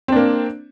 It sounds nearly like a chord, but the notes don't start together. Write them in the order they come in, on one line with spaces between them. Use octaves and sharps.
C4 D4 A#3